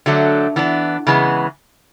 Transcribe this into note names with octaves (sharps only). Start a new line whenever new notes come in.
D3 F#3 A3 D4
E3 B3 D4
C#3 E3 G#3 B3